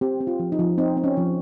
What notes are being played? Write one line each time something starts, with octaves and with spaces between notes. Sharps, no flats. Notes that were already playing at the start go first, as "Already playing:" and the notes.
C4 G4
C4
F4
F3
D#4
F3
C4 D#4
C4
C#4
F3